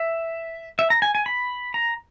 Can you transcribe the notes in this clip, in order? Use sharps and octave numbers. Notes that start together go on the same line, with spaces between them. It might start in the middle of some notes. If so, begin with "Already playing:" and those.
Already playing: E5
E5
A#5
G#5
G#5
B5
A#5